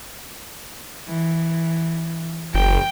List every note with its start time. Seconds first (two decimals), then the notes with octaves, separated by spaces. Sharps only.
1.07 E3
2.55 F#1 G5